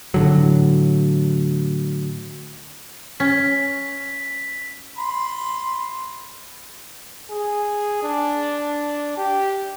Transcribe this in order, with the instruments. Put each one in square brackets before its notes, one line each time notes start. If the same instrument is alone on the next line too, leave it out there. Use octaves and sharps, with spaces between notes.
[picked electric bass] A2 D3 F#3
[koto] C#4 [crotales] B6
[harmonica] B5 C6
[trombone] G#4
D4
G4